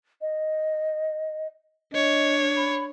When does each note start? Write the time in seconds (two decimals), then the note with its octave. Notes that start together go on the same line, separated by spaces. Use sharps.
0.21 D#5
1.93 D4 C#5 D#5
2.56 B5